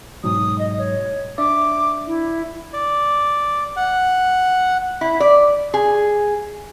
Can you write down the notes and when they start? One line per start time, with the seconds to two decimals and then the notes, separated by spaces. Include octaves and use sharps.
0.24 G#2 B2 F#3 D#6
0.59 D#5
0.78 C#5
1.38 D4 D5 E5 D6
2.07 E4
2.73 D5
3.77 F#5
5.01 E4
5.20 D5
5.74 G#4